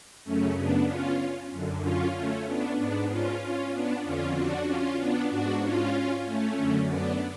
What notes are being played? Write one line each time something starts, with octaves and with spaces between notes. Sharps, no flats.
F#2 C#3 A3 C#4
B3 D4
C#4 F4
F#2 D3
C#4 F4
A3 C#4
B3 D4
G#2 B3 D4
C#4 F4
C#4 F4
B3 D4
F2 D3 C#4 F4
D4 F#4
C#4 F4
B3 D4
G#2 D4 F#4
C#4 F4
A3 C#4
F#2 D3
B3 D4